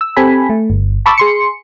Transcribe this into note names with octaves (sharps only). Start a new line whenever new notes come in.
E6
C4 G4 A4 G#5 B5
A3
G1
A5 B5 C#6 D6 E6 A6
G#4 C6 C#7